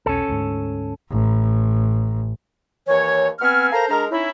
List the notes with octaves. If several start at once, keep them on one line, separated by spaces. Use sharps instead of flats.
E1 B1 C#4 A4
D2 G#2
A1
D#2 E3 C#5
B3 C4 G#5 F6
A4 A#4 C5 F5 A#5
G#3 D4 A#4 A#5
C#4 D#4 E4